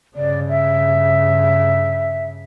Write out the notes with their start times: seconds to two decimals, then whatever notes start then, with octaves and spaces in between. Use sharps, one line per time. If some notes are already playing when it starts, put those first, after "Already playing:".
0.16 G2 C#3 D5
0.49 E5